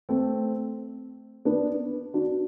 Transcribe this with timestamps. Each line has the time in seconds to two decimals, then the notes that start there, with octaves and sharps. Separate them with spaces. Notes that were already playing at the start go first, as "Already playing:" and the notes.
0.09 A3 C4
1.45 B3 D4
2.14 D4 F#4